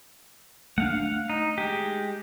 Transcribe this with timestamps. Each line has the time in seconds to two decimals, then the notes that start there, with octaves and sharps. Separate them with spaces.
0.78 A3 D4 F5 F#5
1.30 D#4
1.58 G#3 G4